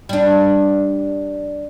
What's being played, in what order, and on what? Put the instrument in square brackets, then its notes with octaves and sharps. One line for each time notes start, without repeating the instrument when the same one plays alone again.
[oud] G3 D4